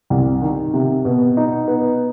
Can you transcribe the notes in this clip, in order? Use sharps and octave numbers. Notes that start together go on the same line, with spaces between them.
C2
D#3
C3
B2
D#4
B3